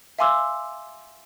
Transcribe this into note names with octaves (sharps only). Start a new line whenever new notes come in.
E5 F5 G#5 C6 D6 E6